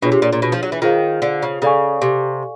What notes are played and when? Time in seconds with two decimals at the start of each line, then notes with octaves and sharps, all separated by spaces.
0.02 B2 D4 F4 G#4 C#5
0.12 C3
0.22 A#2
0.32 A#2
0.42 B2
0.52 F3
0.63 F#3
0.72 E3
0.82 D#3 F4 G#4 C5 F5
1.22 D3
1.43 C#3
1.62 C#3 A4 D5 F5 G#5 C#6
2.02 C3